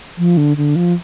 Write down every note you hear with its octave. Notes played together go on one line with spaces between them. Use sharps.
F3
D3
D3
F3